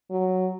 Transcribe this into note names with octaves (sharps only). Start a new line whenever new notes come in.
F#3